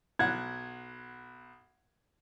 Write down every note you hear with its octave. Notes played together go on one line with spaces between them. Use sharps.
B1 F#5 G#6